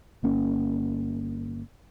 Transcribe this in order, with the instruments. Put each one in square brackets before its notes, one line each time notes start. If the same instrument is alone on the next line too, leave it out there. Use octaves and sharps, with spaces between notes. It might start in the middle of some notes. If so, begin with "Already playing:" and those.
[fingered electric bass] G1 A#3 C#4